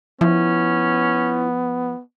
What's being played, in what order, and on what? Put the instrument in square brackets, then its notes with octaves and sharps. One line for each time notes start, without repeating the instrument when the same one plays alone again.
[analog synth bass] F3 [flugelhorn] B3 [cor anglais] C#4 [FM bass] E4